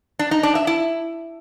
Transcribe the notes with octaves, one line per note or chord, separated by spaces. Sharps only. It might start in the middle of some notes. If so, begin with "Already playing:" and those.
D4
D#4
D4
E5
E4